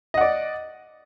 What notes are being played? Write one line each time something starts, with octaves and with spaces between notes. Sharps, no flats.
D5 D#5 F#5